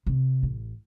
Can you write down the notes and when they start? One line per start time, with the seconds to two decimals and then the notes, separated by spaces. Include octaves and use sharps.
0.07 C3
0.43 A1